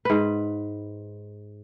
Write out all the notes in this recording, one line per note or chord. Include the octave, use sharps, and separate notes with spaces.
G#2 B4